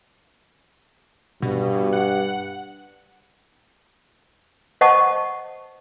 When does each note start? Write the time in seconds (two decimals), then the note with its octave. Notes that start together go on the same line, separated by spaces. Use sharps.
1.42 G2 B2
1.93 F#5
4.81 C5 D#5 F#5 A5 C#6